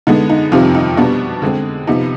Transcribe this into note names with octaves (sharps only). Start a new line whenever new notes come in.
D3 G#3 B3 D#4
D#4
F2 C3 D#3 G3 C4 F4
D#4
B2 G3 B3 D4
D3 G#3 C4
C3 F3 B3 D#4